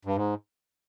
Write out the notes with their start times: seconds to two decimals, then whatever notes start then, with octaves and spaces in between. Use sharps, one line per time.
0.05 G2
0.16 G#2